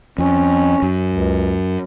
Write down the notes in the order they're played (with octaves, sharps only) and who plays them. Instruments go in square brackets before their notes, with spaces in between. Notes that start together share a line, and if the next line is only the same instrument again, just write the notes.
[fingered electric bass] F2 [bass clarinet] C#4
[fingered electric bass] F#2
[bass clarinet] C#2